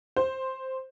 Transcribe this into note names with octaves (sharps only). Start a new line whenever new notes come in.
C5